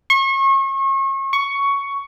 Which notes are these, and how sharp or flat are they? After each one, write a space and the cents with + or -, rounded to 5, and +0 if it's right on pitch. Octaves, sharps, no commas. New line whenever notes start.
C#6 -35
C#6 +10